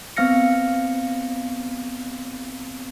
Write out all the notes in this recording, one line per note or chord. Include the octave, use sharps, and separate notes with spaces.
B3 C4 F5 F6 A#6 C#7